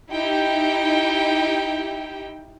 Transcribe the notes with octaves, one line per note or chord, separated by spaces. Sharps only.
D#4 E4 G4 G5